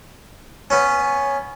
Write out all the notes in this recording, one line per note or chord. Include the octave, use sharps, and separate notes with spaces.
B3 C#4